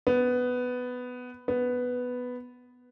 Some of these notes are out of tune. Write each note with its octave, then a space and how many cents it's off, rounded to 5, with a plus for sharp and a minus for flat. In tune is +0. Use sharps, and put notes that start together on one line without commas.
B3 +10
B3 +5